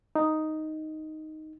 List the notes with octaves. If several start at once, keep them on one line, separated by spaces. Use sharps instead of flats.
D#4